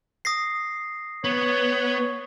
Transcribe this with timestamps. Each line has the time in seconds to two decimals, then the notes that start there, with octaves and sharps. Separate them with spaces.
0.25 D#6 A#6 C7
1.24 B3 C#5